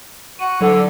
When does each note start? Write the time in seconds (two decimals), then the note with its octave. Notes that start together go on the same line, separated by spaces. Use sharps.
0.39 F#4 D#7
0.61 D3 F#3